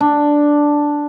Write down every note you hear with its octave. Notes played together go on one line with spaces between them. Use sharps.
D4